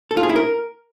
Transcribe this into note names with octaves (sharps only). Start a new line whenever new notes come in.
A4
F4
G#4
E4
A#4